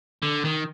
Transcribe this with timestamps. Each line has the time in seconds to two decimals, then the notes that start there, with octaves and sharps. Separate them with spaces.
0.22 D3
0.45 D#3